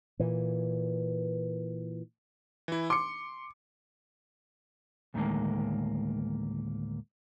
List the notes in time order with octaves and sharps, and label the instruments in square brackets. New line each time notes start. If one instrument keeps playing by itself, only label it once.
[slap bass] A#2 E3
[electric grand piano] E3 E4
[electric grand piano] C6 C#7 [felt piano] D6
[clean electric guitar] D2 A2 D#3 E3 G#3 A#3